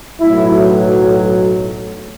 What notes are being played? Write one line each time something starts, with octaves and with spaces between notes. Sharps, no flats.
B1 A2 F#3 A3 E4